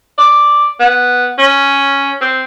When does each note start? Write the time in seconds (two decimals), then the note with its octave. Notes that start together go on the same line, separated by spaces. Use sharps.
0.18 D5
0.80 B3
1.38 C#4
2.21 C4